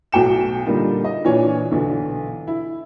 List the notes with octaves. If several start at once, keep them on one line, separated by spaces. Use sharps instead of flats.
B1 A2 F#4 G5 C#7 E7
A#2 D3 G3 A#3 D#4 F4
D#5
A#2 E3 D4 C#5 G#5
B1 D3 E3
E4